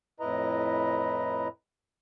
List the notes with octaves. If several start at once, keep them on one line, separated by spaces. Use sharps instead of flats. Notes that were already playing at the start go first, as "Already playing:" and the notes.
F2 A2 E4 B4 D#5 A#5